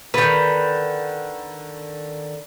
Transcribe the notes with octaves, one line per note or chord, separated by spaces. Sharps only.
D3 D#3 B4